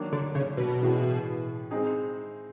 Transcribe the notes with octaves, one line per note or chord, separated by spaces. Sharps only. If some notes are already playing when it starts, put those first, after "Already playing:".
Already playing: D#3 F#3 A#3 D4
D3
C#3
B2
A2 E3 G#3
G#3 C4 D#4 G#4